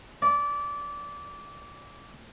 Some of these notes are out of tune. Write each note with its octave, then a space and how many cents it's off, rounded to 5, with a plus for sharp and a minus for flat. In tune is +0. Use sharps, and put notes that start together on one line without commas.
D5 -20